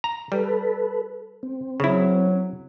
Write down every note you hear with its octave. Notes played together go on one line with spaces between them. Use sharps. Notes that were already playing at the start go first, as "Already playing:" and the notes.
A#5
G3 A4 B4
C4
C#3 F#3 E4